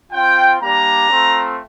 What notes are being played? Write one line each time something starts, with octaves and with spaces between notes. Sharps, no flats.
C4 F4 G5
G3 A#3 D4 A#5
A3 C4 F4